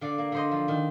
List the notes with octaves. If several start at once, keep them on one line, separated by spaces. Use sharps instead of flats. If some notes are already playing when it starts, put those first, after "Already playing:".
D3 D5 F5
A#3
D3 C5 D#5
F3
D#3